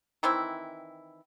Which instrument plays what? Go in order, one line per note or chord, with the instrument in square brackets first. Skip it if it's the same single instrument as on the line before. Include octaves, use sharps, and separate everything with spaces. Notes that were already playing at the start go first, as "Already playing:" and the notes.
[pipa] D#3 E3 C4 E4